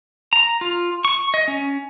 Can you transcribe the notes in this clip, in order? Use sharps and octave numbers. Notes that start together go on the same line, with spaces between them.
A#5
F4
C#6
D#5
C#4